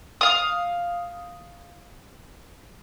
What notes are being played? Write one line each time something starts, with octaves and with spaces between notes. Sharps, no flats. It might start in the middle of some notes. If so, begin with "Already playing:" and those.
F5 D#6